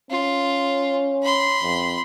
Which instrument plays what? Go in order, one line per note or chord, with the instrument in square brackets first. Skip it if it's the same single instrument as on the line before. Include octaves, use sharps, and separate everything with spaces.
[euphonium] C#4 [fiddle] F4
[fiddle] B5 C6
[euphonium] F2